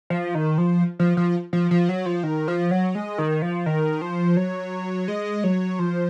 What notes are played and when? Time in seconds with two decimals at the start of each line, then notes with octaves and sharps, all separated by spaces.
0.10 F3
0.35 D#3
0.58 F3
0.99 F3
1.17 F3
1.53 F3
1.71 F3
1.89 F#3
2.06 F3
2.23 D#3
2.48 F3
2.71 F#3
2.95 G#3
3.18 D#3
3.42 F3
3.66 D#3
4.01 F3
4.37 F#3
5.08 G#3
5.44 F#3
5.79 F3